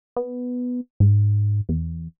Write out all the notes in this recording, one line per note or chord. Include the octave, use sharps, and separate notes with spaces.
B3
G#2
E2